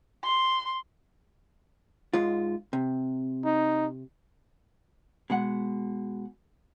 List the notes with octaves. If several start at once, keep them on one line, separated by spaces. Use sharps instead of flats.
C6
G#2 G#3 F4
C3
D#4
B2 G#3 F#5